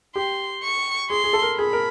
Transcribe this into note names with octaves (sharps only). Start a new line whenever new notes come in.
G4 C6
C#6
G#4 C6
G#4
A4
A#4
G#4 B5
A#4